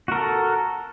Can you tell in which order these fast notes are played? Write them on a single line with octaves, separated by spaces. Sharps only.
F#4 A#4 A4